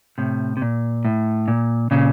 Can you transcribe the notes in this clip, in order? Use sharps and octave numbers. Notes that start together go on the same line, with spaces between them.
A2 C3
C3
A#2
A2
A#2
A#2 C#3